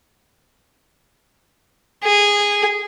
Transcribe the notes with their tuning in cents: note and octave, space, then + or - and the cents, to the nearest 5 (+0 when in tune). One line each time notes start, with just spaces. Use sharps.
G#4 -15